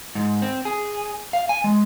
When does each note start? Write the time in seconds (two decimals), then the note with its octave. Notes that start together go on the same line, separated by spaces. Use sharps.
0.15 G#2
0.42 C4
0.65 G#4
1.33 F5
1.49 G#5
1.64 G#3